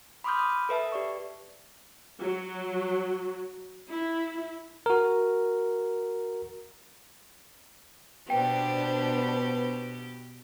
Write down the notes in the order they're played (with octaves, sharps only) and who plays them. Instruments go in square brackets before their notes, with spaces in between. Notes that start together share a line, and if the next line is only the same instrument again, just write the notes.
[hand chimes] B5 C6 D6 D#6 F6 G6
B5 D#6
A4 B4 E5 A5
G4 D5 C#6
[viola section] F#3
E4
[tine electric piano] F#4 A#4
[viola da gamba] B2 G4 [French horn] B3 [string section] D4 C5 [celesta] G5